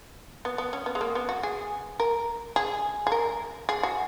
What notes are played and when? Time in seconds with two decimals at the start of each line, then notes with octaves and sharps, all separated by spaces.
0.45 B3
0.58 B3
0.73 C#4
0.86 B3
0.95 G#3
1.01 A#3
1.15 B3
1.29 F#4
1.43 G#4
2.00 A#4
2.56 G#4
3.07 G#4
3.12 A#4
3.69 G#4
3.83 F#4